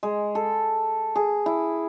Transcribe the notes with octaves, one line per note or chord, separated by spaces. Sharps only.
G#3
A4
G#4
E4